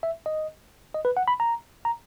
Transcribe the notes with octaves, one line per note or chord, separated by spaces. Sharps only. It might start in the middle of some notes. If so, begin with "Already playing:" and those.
E5
D#5
D#5
B4
F#5
B5
A#5
A#5